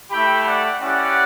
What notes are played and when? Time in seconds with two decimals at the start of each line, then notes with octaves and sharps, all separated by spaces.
0.11 A3 E4 G4 G5 B5
0.46 D5 F#5
0.81 C#4 E4 G4 D5 F#5